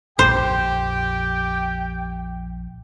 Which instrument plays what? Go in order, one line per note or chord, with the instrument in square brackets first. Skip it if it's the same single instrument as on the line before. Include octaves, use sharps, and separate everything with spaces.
[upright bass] A#1 F2 [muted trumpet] G4 [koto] C5 [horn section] G5